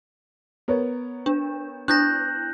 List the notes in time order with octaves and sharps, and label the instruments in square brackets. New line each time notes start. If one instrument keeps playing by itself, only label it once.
[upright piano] B3 A#4 C#5
[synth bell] D4
[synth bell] D4 E4 [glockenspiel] F#6 G6 A#6